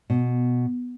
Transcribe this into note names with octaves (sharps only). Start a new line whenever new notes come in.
B2